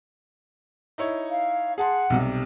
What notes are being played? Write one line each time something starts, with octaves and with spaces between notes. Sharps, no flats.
D#4 E4 C#5
F5
G#4 F#5 A5 C6
B1 C3 G3